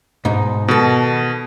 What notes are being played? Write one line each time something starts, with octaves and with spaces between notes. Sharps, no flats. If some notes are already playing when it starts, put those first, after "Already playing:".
G#2 B2 D#4
B2 D#3 A4